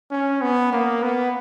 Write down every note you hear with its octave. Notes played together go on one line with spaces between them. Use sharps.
C#4
B3
A#3
B3